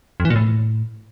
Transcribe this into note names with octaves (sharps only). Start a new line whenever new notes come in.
F2
E3
A#2
A2